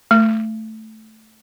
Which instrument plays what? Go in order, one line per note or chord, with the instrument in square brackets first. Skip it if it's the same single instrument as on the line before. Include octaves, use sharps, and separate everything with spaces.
[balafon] A3